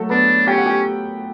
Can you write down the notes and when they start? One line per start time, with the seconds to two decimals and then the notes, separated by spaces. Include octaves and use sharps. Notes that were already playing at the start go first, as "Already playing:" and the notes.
Already playing: F#3 A3 F#4 A4
0.10 B3 D4 B4
0.47 C#4 G4 G5
0.58 F#5
0.66 G4 G5